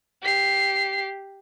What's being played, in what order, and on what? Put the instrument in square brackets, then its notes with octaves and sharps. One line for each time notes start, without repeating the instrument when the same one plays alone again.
[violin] G4 C7